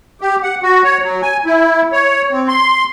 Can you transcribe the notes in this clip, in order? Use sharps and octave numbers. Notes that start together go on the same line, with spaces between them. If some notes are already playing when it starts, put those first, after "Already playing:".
G4
F#5
F#4
C#5
F#3
G#5
E4
C#5
C4
C6